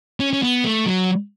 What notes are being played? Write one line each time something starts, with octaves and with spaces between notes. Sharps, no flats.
C#4
C#4
B3
A3
F#3